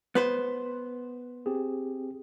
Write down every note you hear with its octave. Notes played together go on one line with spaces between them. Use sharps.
B3 B4 C5
C4 G4 G#4